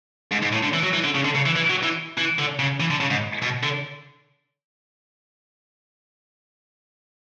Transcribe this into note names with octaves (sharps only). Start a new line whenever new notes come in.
G#2
G#2
A2
D3
E3
F#3
E3
D3
C#3
D3
C#3
E3
E3
F#3
E3
E3
D3
C#3
E3
D3
C#3
G#2
B2
D3